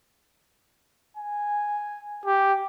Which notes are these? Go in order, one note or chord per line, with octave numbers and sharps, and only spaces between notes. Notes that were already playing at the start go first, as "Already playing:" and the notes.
G#5
G4